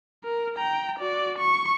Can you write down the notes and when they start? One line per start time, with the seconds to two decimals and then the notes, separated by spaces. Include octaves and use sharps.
0.24 A#4
0.56 G5 A#5
0.99 F#4 D5
1.39 C#6